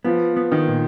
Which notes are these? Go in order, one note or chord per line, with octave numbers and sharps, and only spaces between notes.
F3 B3
B3
D#3
A#2